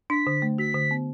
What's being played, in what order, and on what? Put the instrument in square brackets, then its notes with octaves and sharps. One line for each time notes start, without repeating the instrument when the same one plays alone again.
[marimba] D4 [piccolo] B6
[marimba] D3
A3
[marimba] F#4 [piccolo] B6
[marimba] D3
B3